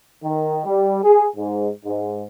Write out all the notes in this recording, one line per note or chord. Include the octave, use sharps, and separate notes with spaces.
D#3
G3
G#4
G#2
G#2